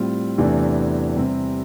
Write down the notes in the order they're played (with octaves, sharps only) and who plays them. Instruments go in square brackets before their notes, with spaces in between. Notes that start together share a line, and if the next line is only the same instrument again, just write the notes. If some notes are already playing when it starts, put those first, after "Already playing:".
Already playing: [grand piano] A2 G3 C4 F4
E2 C3 E3 A3 D4
C3 G3 C4